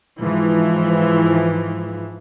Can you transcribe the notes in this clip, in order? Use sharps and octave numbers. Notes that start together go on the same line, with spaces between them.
G#2 E3 F3